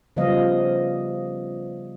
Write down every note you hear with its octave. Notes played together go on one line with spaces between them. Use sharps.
C#3 F3 G3 B3 D#5 F5